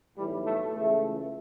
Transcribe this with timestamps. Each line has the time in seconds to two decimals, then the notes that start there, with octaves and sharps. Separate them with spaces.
0.16 B1 A2 E3 G3
0.46 A3
0.74 C#2 C#3 E3 A3